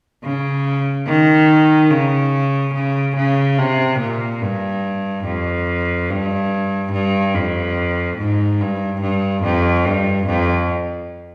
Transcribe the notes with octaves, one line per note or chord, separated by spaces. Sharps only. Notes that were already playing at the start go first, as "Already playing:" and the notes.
C#3
D#3
C#3
C#3
C#3
C3
A#2
G2
F2
G2
G2
F2
G#2
G2
G2
F2
G2
F2